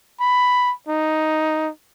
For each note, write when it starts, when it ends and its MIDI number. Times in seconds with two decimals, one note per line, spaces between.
0.21 0.72 83
0.88 1.69 63